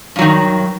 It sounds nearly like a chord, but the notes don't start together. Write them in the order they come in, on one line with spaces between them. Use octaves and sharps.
G2 F#3 D#3